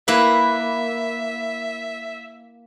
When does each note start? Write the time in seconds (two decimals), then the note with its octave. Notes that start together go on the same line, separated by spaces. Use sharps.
0.08 A#3 E4 B4 E5